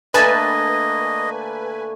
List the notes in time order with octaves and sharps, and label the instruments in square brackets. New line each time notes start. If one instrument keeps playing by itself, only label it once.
[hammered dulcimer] D3 A3 A#3 [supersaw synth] B4 G#5 [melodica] D#5 [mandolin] A5